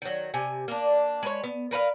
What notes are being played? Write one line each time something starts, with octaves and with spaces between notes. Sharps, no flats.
D#3 F#3
C3 G#5
A#3 D4
G#3 B4 C#5
B3
A#4 B4 D5 F5